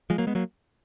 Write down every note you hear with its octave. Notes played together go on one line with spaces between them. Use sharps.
F3 G#3
F#3 A#3
G#3 B3
F#3 A#3